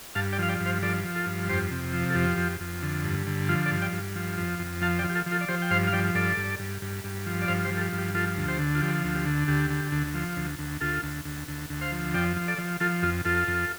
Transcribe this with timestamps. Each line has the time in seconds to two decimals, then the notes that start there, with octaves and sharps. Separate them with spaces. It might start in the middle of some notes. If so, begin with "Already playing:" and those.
0.15 G2 F5 A5
0.32 D5 G5
0.39 F3 F5
0.49 D5 G5
0.60 G2
0.66 C5 F5
0.82 F3 A4 D5
1.04 F3
1.15 F4 A4
1.26 G2
1.49 F2 G4 C5
1.71 C3
1.93 F3
2.10 A4
2.15 F2 G4
2.38 F2
2.61 F2
2.82 D3
3.04 G2
3.27 D3
3.49 F3 F4
3.65 A4 D5
3.71 G2
3.81 D5 G5
3.93 G2
4.16 F3
4.38 F2
4.59 F2
4.81 F3 F5 A5
4.99 D5 G5
5.04 F3
5.09 G4
5.15 F4 A4
5.26 F3
5.31 F4 A4
5.41 D5
5.48 F3 G4 C5
5.62 G5
5.71 G2 C5 F5
5.87 F5
5.93 F3 D5 G5
6.15 G2 A4 D5
6.37 G2
6.59 G2
6.82 G2
7.04 G2
7.26 F3
7.42 D5
7.48 G2 C5 F5
7.65 G4 C5
7.70 F3
7.77 A4
7.81 G4
7.93 G2
7.98 G4
8.14 F3 F4 A4
8.37 D2
8.48 G4 C5
8.59 D3
8.75 F4
8.81 F3 G4
9.04 D2
9.15 G4
9.26 D3
9.48 D2 G4
9.70 D3
9.92 D2
10.15 F3
10.37 D2
10.59 D2
10.81 D2 F4 A4
11.03 D2
11.25 D2
11.48 D2
11.70 D2
11.81 C5 F5
11.92 F3
12.14 F2 D5 G5
12.37 F3
12.48 A4 D5
12.58 F3
12.80 F3 F4 A4
13.03 F2 F4
13.25 F2 F4 A4
13.48 F2